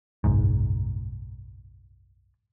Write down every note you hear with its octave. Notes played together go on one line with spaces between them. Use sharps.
F#1 B1 G#2